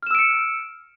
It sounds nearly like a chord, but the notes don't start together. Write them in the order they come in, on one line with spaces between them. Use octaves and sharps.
F6 E7 E6 D7 C#7